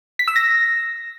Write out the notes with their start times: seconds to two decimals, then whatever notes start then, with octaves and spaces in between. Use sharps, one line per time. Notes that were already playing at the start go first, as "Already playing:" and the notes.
0.19 B6
0.28 E6
0.36 A#6